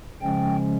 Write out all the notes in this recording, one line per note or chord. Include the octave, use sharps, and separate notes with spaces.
C#3 F3 G#3 C#4 G5